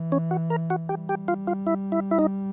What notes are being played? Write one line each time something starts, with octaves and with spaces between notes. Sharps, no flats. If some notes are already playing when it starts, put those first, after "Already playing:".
Already playing: E3
C#4
F#4
A#4
F#4
G3 G4
G4
F4
F4
E4
E4
E4
D#4